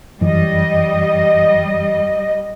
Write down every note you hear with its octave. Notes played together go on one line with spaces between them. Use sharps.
F#2 E3 G3 D#5